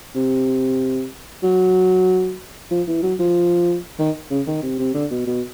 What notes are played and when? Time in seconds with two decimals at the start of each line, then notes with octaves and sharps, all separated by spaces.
0.15 C3
1.43 F#3
2.71 F3
2.87 E3
3.03 F#3
3.19 F3
3.99 D#3
4.30 C#3
4.47 D#3
4.63 C3
4.79 C3
4.94 D3
5.11 B2
5.26 B2